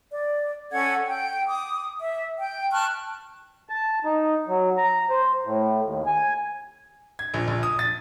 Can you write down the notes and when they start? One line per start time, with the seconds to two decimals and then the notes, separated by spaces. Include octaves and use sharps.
0.12 D5
0.72 C#4 A4 F#5 G#6
1.07 G5
1.46 D6 D#6
2.00 E5
2.38 G5
2.72 A5 C#6 F6 F#6
3.69 A5
4.05 D#4
4.47 F#3
4.78 A#5
5.10 C5
5.44 A2
5.83 D#2
6.06 G#5
7.19 G#6
7.34 A#1
7.48 A#1
7.63 D#6
7.79 A6